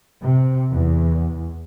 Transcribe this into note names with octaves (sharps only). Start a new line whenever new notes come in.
C3
E2